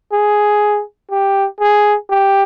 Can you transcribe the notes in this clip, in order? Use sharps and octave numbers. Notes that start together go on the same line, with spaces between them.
G#4
G4
G#4
G4